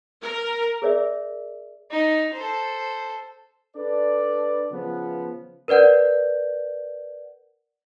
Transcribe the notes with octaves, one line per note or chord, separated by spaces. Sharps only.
A#4
G#4 A#4 C#5 D5 E5
D#4
A4 C5
D4 A4 B4 D5
C#3 F3 B3
A#4 B4 D5 F#5 G6